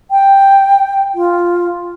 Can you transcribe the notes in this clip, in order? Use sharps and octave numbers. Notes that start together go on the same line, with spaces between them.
G5
F4